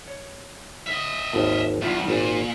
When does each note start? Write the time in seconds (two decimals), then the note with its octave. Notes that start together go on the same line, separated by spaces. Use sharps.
0.08 C#5
0.87 D#5 E5
1.33 G#1 D#2 A5
1.82 E2 G2 D4 F4 E5
2.08 G#1 A#2